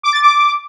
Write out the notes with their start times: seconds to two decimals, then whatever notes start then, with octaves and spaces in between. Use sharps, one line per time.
0.03 D6
0.13 A6
0.22 D6